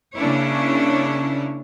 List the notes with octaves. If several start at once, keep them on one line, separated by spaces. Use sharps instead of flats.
C#3 A#3 C#4 D4 E4 C#5